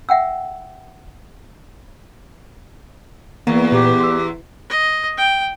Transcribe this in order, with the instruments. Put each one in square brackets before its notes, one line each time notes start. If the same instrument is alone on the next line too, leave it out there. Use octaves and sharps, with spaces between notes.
[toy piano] E5 F#5 G5 E6
[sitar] E2 [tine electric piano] A#3 [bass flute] B3
[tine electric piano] A#2 [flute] G4
[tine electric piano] C6 E6
[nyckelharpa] D#5
G5